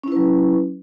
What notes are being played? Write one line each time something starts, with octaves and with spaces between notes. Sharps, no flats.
F#3 C#4 E4 B4